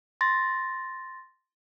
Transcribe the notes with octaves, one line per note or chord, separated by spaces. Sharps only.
C6 A6 A#6